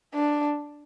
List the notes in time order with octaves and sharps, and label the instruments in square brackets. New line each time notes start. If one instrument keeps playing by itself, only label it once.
[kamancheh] D4